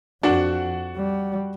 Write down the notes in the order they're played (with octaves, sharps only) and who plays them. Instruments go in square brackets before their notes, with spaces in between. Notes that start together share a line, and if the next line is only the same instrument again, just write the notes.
[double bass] F2 [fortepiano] D4 [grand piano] F#4 F#5
[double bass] G3